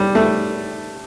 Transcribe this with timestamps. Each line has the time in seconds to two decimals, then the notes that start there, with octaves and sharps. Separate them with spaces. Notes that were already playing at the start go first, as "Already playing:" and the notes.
Already playing: G3
0.15 A3